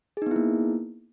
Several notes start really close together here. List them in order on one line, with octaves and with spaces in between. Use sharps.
G#4 D#4 B3 E4 A#3